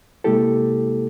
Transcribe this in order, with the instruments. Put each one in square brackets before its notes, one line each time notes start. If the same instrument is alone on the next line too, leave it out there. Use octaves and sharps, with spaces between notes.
[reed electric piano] C3 G#3 A#3 E4 G4 A4